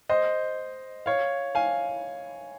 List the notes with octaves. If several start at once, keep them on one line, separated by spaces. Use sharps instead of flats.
C5 D#5
C#5 F5
F5 G#5